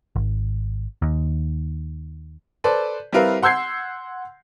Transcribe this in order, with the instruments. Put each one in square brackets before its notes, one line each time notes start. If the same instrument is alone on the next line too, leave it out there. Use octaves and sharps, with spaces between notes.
[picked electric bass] G#1
D#2
[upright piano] A4 B4 C5 D5
G3 C4 E4 A#4 B4 F5
F#5 C6 E6 G6 G#6 C7